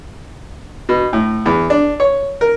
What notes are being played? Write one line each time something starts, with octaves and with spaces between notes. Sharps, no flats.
B2
A2
E2
D4
C#5
A#4